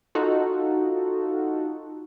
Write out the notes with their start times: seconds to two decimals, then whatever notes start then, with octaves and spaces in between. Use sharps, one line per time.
0.15 D#4 F4 F#4 A4